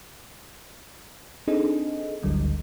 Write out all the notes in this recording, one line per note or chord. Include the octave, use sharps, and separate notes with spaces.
C4 D4 D#4 G#4 A4 D#5
G#1 D2 G#2 D3 F#3 G3